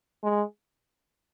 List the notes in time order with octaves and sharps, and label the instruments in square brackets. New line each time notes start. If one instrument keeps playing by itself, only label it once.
[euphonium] G#3